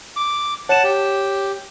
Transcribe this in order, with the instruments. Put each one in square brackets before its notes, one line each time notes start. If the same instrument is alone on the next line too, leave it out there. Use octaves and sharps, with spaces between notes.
[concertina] D6
[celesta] C#5 E7 [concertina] F#5 A5
[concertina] G4